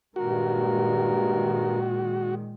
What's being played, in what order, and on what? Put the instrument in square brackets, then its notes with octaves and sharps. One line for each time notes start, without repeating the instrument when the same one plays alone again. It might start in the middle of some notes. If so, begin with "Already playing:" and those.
[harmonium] G2 A#4 [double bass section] A#2 D#3 G#3 [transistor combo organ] F#4